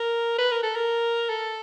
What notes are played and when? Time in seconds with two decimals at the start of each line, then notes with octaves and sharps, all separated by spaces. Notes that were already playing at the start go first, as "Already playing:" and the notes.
Already playing: A#4
0.38 B4
0.51 A#4
0.63 A4
0.76 A#4
1.29 A4